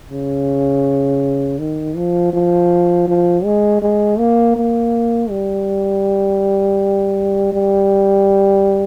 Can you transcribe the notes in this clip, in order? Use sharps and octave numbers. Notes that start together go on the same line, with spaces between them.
C#3
D#3
F3
F3
F3
G#3
G#3
A#3
A#3
G3
G3